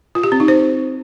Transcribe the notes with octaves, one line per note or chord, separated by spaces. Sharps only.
F4
G4
C4
D#4
C5